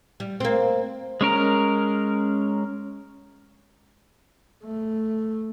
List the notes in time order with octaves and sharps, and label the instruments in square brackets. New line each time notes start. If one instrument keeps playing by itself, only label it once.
[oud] G3
A#3 C4
[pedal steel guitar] G#3 C#4 A#4 A#5
[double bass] A3